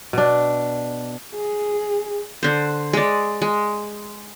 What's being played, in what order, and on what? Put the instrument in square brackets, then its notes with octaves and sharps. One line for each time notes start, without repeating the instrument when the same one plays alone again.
[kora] B2 D4
[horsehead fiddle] G#4
[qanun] D3 C5
G#3 D5
G#3